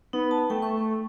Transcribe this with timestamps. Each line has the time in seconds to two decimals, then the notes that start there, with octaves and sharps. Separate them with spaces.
0.13 B3 D#4
0.31 A5
0.50 A3 G5
0.62 A3 C#6